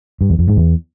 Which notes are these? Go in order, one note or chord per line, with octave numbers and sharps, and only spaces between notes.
G2
E2
F2
G#2
E2